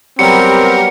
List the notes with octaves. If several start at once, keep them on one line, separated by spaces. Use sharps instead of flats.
F#3 G3 B3 C4 G4 A#4 C#7